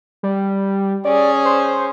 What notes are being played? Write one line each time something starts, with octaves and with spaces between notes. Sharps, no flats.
G3
C#4 G#4 D5
C5